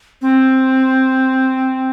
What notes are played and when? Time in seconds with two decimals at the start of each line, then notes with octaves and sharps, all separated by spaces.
0.22 C4